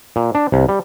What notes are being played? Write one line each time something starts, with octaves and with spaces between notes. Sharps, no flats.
A#2
D4
C2
G3